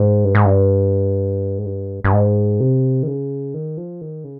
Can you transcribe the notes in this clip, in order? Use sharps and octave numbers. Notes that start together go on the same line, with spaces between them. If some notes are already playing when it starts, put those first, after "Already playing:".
Already playing: G#2
G2
G#2
G2
G#2
G2
G2
G#2
C3
D#3
C#3
D#3
F3
D#3
C#3